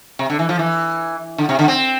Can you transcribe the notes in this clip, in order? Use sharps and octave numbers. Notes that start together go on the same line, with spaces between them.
C3
D3
E3
F3
E3
D3
C3
D3
C4